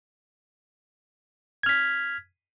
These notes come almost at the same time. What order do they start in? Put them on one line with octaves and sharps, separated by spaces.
G#6 F6 B6